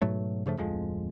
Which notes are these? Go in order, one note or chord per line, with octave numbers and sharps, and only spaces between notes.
G#2 B2 F#3 A3
G2 C#3 F3 A3
D1 F2 F3 G#3